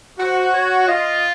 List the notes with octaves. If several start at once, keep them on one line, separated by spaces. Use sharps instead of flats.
F#4 C5
C#5
F4 D#5